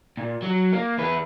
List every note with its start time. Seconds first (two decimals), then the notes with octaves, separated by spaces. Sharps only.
0.17 A#2
0.42 F#3
0.73 A#3
0.98 E2 B4